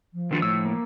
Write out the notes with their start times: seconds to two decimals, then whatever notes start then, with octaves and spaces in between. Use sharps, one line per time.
0.13 F3
0.31 D#3 D4 F4
0.42 A2 E6
0.65 A#3